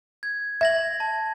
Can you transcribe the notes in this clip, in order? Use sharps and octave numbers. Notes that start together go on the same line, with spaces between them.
G#6
E5 G#6 A#6 F#7
A5